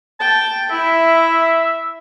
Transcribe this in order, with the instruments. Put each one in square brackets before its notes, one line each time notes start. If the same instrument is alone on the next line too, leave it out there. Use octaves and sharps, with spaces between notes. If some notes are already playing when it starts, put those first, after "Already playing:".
[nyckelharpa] G5 [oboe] A5
[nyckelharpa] E4 [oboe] E5